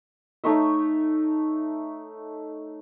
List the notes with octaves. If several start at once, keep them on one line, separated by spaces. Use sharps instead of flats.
A3 D#4 C#5 E5